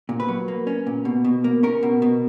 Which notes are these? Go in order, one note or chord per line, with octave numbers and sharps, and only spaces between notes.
A#2
B4
F#3
A#3
C#4
A#2
B2
B2
A#3
C#4 A#4
B2
B2